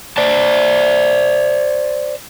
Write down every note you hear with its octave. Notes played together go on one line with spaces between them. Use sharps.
C5 D5 A5